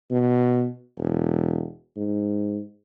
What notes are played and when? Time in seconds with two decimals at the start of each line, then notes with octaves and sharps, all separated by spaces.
0.11 B2
0.98 E1
1.97 G#2